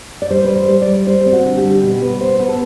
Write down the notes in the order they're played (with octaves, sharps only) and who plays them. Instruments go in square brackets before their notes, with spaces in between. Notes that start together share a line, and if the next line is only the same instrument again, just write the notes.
[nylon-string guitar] D5
G3 C5
G3 B4
C5
G3
D5
G3
G3 C5
C4
F#4
D3
G4
G3
B2 G4
B3 B4
B3 C5
B3 B4
A4